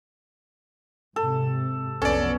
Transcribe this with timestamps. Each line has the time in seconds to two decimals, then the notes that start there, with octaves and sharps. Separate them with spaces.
1.16 G#2 C3 A4
2.02 B1 F2 B3 C#4 A4 D5